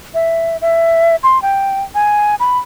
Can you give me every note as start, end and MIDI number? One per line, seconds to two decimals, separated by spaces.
0.14 0.57 76
0.62 1.16 76
1.23 1.41 84
1.42 1.84 79
1.95 2.35 80
2.40 2.58 83